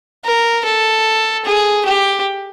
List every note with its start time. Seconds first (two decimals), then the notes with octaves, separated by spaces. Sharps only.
0.25 A#4
0.64 A4
1.45 G#4
1.85 G4